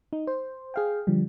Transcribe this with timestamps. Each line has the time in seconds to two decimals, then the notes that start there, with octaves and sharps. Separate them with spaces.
0.13 D#4
0.27 C5
0.74 G#4 F5 G5
1.07 D3 F3 G3